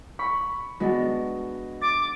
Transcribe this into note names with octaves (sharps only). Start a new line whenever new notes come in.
B5 C#6
G#3 B3 D4 F#4 D#5
D6 A6